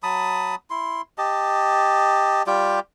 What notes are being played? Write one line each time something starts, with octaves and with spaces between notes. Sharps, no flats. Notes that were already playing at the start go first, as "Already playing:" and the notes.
F#3 A5 B5 D#6
E4 C6
G4 D#5 A5
G3 F4 G4 G5